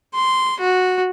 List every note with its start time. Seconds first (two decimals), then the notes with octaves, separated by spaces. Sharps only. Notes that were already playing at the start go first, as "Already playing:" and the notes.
0.14 C6
0.60 F#4